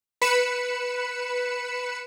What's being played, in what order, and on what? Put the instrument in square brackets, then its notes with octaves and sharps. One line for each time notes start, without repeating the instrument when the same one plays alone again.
[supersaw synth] B4 B5 C#7 E7